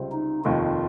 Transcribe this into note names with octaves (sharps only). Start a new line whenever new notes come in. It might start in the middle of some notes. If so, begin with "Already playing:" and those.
Already playing: C#2 C3 G3 C4
D#4
F1 D#2 D#3 F4